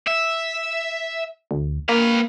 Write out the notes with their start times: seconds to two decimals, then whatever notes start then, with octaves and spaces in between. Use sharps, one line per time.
0.07 E5
1.51 D2
1.89 A#3 B4 F5